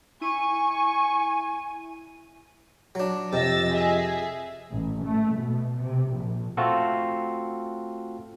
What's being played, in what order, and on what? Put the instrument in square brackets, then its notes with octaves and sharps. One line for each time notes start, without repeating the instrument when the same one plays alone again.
[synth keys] E4 D#7 [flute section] G#5 [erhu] C#6
[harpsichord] F#3 D4
[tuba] F2 [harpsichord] C3 [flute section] D#5 [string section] E6 A6 A#6
[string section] G#4 E5
[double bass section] A1
A3
B2
C3
A#1
[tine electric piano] A3 C4 F4 F#4 A4